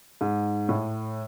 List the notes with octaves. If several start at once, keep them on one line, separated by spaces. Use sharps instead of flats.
G#2
A2